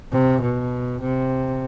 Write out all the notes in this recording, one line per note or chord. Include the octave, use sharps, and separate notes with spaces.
C3
B2
C3